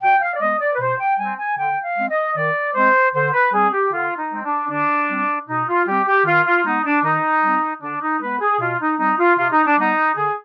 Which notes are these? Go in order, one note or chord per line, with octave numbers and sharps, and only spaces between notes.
B2 G5
F5
D5
G#3 B3 D#5
D5
B4
B2 C5
G5
G3 C4 G#5
G#5
D3 G5
F5
G#3 C4
D#5
D#3 D5
G#3 C4 C5
D3 C5
B4
G3 C4 G#4
G4
D3 F4
D#4
G#3 C4
D4
D3 D4
G3 C4
B2 D#4
F4
G3 C4 G4
G4
D#3 F4
F4
G#3 B3 D#4
D4
D#3 D#4
G3 C4
D3 D4
D#4
G#3 B3 B4
G#4
B2 F4
D#4
G3 C4 D#4
F4
C3 F4
D#4
D4
G3 B3 D#4
D3 G#4